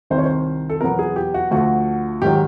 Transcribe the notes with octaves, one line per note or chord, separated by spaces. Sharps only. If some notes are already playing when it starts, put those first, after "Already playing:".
C2 C3 D#3 C5
C#5
C5
A4
E2 B2 F#3 B3 A#4
G#4
G4
F#4
D2 D3 F3 A3 F#4
G#2 D#3 F#3 G4